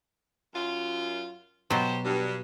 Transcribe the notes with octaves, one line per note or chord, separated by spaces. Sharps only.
F#2 F4
B2 F#3 F#4 G4 C5
G2